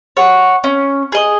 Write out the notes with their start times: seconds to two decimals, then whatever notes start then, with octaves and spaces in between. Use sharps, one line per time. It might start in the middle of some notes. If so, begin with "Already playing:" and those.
0.17 C#5 F#5
0.64 C#4
1.12 G#4 D#5